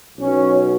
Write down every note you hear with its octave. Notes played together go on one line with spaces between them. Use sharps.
B1 B2 C#4